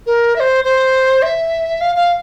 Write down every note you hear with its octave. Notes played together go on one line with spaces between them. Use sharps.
A#4
E5
C5
C5
E5
F5
F5